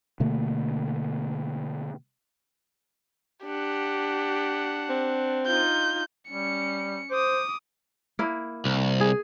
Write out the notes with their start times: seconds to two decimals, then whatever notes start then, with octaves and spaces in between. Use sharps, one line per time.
0.20 B2 D3 A3 A#3
3.45 D4 G4 F#5
4.89 C4
5.46 D#4 F4 G6
6.30 G3 C#4 C#7
7.11 C5 D6 D#6
8.19 A#3 E4
8.65 C2
9.00 G#4